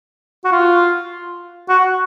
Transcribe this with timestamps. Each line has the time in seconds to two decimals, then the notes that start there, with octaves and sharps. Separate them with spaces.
0.45 F#4
0.52 F4
1.69 F#4